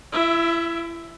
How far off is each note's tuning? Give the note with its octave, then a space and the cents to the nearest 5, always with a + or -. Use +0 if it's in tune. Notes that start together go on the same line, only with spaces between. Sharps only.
E4 +30 E5 +0